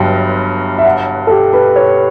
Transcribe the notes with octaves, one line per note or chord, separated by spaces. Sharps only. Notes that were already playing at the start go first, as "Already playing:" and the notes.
Already playing: G1 G2 F#3 G5
E5
F#5
A4
G4
B4
C#5